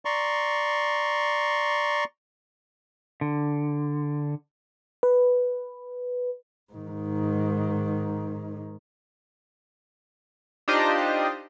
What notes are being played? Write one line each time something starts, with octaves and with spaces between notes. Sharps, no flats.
D5 A#5 C6 C#6
D3
B4
G#2 D#3
D4 D#4 F4 G4 C5 D#5